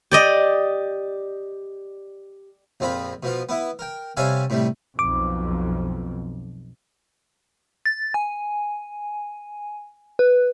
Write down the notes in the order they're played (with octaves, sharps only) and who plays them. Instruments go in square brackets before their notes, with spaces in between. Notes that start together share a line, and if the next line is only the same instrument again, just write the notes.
[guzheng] G4 D5 D#5
[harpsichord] A#1 F2 C4 F4 B5
B2 F3 F4
B3 E4
A#4 G5
C3 G3 C#4 A4 F5 G#5
A2 C3 G3
[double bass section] B1 F2 [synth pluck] D6
[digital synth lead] A6
G#5
B4